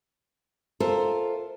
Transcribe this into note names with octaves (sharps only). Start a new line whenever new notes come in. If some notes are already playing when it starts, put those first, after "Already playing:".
F4 A4 A#4 C5 E5